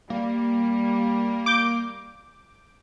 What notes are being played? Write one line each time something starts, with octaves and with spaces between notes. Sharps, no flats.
G3 A#3
D6 G6